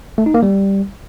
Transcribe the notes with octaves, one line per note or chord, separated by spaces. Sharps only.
A3
D#4
A#3
G3